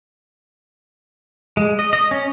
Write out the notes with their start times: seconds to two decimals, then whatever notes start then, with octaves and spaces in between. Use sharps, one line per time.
1.57 G#3
1.79 D#5
1.93 D#5
2.11 C#4